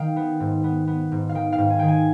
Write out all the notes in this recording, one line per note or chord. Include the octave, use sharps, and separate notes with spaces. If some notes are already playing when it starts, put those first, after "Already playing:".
Already playing: D#3 F5 G5
B3
G#2
B3
B3
G#2
F5
D#3 G5
F5
G#2
G#5
D#3 G5
G#5